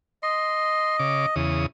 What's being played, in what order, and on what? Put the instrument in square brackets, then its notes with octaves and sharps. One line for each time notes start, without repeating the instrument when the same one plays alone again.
[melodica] D#5 [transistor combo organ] C6
[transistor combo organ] C#3 D6
E2 C#3 D#6